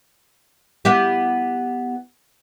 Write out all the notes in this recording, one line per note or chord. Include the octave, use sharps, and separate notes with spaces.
B3 E4 G4